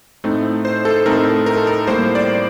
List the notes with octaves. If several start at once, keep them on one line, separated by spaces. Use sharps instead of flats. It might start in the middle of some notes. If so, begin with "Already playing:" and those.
A2 A3 C4 D#4
C5
A4
A2 A3 C4 D#4 A#4
A#4
A4
A#4
A2 G3 A#3 C5
D5